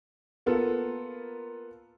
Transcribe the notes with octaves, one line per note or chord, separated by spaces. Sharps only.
A#3 B3 F4 A4